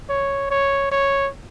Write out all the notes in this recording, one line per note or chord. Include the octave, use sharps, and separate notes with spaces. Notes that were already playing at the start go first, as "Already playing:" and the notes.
C#5
C#5
C#5